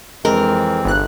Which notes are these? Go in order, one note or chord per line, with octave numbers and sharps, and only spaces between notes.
F2 E3 G#3 C4 A#4
G1 F#6